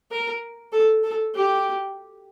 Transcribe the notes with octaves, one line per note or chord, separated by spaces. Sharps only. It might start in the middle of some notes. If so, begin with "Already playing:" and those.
A#4
A4
A4
G4